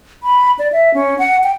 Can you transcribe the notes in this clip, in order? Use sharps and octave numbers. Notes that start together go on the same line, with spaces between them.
B5
D5
E5
C#4
F#5
G5